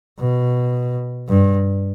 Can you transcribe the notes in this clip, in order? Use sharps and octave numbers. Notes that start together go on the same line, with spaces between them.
B2
G2